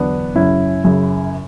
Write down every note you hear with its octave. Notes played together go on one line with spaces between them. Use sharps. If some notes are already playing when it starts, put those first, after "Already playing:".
Already playing: E2 D3 F#3 B3 D4
F#2 C#3 F#3 C#4 E4
F#2 C#3 F#3